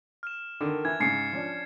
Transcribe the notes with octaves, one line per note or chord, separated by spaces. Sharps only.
F6 E7
D3 D#3
E3 G#6
G#2 C#3 A6 C7 C#7
F3 C#4 D4